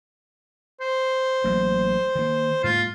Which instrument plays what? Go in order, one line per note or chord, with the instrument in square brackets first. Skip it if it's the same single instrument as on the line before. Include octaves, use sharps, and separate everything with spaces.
[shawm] C5
[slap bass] A1 F#3 A#3
D#3 A#3
[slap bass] G#2 G3 A#3 [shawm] F4